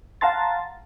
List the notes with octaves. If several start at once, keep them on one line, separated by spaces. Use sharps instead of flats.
F5 F#5 A5 A#5 C6 A6